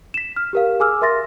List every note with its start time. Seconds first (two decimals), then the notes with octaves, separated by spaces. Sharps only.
0.14 B6 E7
0.36 F6
0.53 G4 A#4 F5
0.80 G#4 G#5 D6 E6 F6
1.02 A#4 E5 C6 A6 A#6